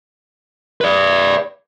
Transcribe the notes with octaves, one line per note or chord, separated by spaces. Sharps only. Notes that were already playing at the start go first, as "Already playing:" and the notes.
B4 D5